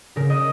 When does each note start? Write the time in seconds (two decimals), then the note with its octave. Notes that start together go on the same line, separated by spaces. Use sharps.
0.16 C#3 A#4
0.30 D#5